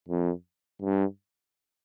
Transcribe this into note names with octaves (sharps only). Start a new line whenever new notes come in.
F2
G2